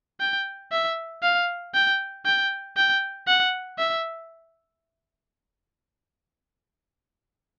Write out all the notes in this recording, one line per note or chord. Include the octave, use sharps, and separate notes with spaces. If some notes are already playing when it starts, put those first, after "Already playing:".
G5
E5
F5
G5
G5
G5
F#5
E5